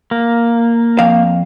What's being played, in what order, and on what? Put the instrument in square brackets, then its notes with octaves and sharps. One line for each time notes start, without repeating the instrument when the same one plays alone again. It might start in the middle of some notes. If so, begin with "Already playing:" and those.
[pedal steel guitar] A#3
[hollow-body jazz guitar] F2 F5